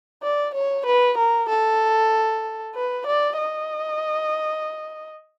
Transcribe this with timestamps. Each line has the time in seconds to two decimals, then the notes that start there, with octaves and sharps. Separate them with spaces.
0.23 D5
0.54 C#5
0.86 B4
1.18 A#4
1.49 A4
2.75 B4
3.07 D5
3.38 D#5